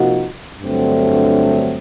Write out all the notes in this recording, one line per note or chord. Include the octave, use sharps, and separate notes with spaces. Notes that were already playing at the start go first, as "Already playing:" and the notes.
Already playing: C3 F3 A#3 D#4 F#4
G2 D3 F#3 A3 C4